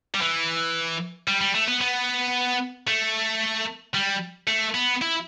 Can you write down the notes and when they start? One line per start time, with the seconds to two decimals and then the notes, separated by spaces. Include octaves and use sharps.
0.15 G3
0.21 E3
1.28 G3
1.41 G3
1.55 A3
1.68 B3
1.81 B3
2.88 A3
3.94 G3
4.47 A3
4.74 B3
5.02 E4